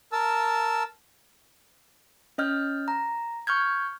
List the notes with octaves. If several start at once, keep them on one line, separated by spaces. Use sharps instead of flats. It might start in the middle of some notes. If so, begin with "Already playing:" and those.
A#4 A5 E6
C#4 D#5 F6 G6
A#5
C#6 F6 G6 G#6